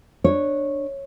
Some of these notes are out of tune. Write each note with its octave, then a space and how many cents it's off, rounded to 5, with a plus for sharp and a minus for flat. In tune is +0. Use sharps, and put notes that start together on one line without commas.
D4 +10 C#5 -10